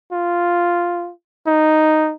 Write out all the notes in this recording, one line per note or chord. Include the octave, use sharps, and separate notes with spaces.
F4
D#4